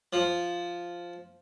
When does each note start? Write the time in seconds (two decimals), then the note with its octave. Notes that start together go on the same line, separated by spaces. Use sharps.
0.13 F3